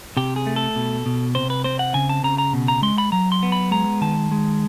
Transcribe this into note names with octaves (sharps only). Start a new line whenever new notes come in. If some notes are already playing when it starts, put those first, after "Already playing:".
C3 G4
G#4
A3
A4
B2
B2
C3 C5
B4
C4 C5
F#5
C#3 G#5
A5
C#3 A#5
A#5
B2
A#5
G#3 C6
B5
F#3 A#5
C6
B3
B5
G#3 A#5
D#3 A5
G#3